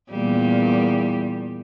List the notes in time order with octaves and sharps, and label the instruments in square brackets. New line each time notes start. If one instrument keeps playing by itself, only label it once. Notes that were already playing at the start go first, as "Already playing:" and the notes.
[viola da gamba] E2 A#2 G3